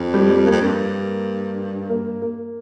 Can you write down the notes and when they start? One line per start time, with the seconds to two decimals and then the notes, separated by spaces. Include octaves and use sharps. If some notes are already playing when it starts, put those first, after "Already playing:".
Already playing: F2
0.14 G3
0.30 G3
0.46 A#3
0.52 F2
0.62 G2
1.90 A#3
2.22 A#3